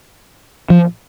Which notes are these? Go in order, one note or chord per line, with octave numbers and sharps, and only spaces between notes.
F3